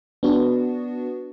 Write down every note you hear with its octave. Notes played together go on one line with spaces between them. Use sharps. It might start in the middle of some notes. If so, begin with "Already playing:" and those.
B3 D4 F#4